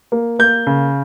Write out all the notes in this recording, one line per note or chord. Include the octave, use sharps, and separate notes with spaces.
A#3
A#3 G6
C#3